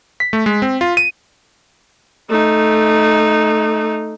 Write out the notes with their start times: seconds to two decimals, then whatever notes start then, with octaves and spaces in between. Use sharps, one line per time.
0.20 B6
0.33 A3
0.46 G#3
0.62 C4
0.81 F4
0.97 D#7
2.29 A3 D#4